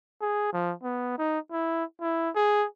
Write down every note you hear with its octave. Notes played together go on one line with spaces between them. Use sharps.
G#4
F3
B3
D#4
E4
E4
G#4